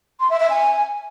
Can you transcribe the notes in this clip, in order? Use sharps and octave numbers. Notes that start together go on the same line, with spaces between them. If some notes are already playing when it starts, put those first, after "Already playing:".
C6
E5
E5
G#5